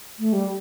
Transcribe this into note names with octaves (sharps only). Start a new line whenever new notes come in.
A3
G3